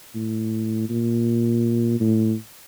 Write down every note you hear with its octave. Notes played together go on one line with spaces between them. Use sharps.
A2
A#2
A2